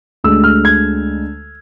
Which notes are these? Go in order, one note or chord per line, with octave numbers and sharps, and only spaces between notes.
D2 D3 G#3 E6
F6
G#6